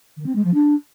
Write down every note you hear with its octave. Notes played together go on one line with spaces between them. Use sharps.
D#3
C4
G#3
F3
D4